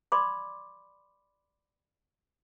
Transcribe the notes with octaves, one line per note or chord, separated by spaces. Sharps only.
D5 B5 C6 D6